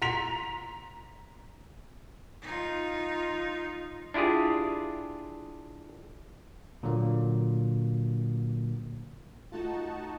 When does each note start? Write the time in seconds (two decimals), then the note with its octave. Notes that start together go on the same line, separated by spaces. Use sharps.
0.02 A#5 C6 B6 F7
2.42 D#4 F4
4.14 D4 E4 F4 G4 G#4
6.83 A#2 D3 F#3 A#3
9.52 A3 D#4 F4 F#4 A5